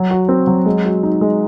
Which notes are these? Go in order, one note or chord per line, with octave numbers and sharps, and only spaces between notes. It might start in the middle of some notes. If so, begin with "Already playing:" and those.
Already playing: F#3
F#4
C4
F#3
G#3
F#4
D#4
G#3